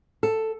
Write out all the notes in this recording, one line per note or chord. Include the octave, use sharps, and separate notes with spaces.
A4